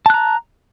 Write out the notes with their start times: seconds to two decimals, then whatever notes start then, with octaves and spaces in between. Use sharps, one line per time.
0.06 A5
0.10 F#6
0.14 A#5